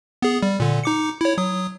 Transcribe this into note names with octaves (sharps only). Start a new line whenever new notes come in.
B3 G#4
G3
A#2 D3
D#4 D6 C#7
E4 C#5
F#3 D#6